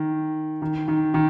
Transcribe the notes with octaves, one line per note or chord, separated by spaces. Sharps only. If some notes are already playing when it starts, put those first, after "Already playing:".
Already playing: D#3
D#3
D#3
D#3